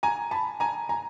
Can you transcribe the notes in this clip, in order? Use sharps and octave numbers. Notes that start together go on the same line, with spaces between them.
G#5 A#5
A5 B5
G#5 A#5
G#5 A#5